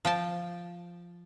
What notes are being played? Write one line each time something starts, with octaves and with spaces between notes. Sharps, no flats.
F3 G5 A5